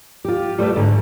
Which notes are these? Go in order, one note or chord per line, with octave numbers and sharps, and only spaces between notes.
F4 G4
G3 A3 B4 C#5 E5
G#2 D3